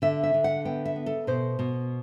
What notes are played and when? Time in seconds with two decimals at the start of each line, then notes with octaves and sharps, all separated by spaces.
0.02 D3 E5
0.23 E5
0.34 D3
0.44 F#5
0.65 B3 G5
0.85 E5
0.96 B3
1.06 A4
1.27 B2 C5
1.59 B2